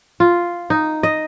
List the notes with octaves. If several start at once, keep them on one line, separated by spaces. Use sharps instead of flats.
F4
D#4
D#5